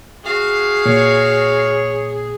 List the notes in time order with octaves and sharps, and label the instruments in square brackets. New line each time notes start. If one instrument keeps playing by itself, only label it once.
[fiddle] F#4 F5 [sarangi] G#4
[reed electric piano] A#2 [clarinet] C#5